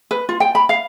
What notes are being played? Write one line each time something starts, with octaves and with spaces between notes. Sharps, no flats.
B4
F4
G5
B5
F5